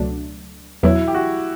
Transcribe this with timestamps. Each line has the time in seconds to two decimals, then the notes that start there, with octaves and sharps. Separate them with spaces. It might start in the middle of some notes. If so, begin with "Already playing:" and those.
Already playing: C#2 B2 F#3 A3 D4
0.83 E2 B2 F#3 E4
1.08 G4
1.14 F#4